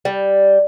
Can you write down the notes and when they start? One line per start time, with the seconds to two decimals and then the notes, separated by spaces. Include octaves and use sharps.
0.05 G3